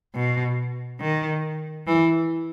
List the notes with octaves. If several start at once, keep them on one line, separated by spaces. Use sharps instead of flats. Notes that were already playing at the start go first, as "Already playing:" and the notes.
B2
D#3
E3